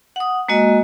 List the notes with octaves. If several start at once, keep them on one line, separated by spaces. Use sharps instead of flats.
F#5 D#6
G#3 A#3 F#4 D#5